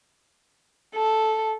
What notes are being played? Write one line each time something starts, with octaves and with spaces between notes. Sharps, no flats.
A4